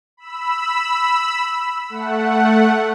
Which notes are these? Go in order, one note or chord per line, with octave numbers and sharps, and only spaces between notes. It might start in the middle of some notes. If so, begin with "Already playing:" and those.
B5 E6
A3 F#5